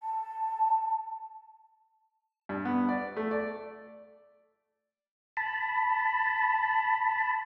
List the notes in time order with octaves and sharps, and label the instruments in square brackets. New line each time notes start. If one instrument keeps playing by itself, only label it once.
[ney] A5
[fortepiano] G2
B3
D5
A3
D5
[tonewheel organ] A5 B5